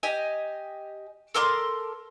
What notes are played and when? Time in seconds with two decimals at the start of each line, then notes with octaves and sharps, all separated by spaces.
0.03 G4 D#5 G#5
1.34 A4 A#4 C6 D6